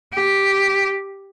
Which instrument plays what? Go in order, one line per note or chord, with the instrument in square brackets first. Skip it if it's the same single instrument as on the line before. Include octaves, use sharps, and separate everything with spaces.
[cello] G4